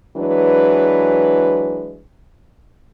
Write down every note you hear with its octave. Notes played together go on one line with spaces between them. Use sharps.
E3 F#3 G#3 D4 B4